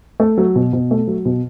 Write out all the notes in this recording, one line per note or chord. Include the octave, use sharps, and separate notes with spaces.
A3
F#3
B2
B2
A3
F#3
B2